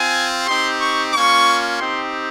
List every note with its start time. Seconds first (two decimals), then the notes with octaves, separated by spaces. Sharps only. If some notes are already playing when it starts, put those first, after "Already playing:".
Already playing: C4 F4 G#5
0.47 C4 D#4 G4 C6
0.80 C#6
1.13 A#3 C#4 F4 C#6
1.79 C4 D#4 G4 C6